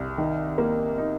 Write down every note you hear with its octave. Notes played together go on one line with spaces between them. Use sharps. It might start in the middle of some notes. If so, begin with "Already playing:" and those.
Already playing: C2
D#3
A#3
D#4